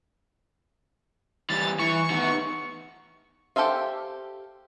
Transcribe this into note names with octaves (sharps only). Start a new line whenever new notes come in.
E3 G3 A6
E3 C#6
D#3 B3
G4 A4 C5 E5 F5